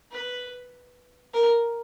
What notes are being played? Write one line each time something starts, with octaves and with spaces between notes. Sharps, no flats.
B4
A#4